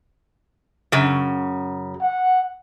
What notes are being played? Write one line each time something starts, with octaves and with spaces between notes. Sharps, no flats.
F#2 C#3
F#5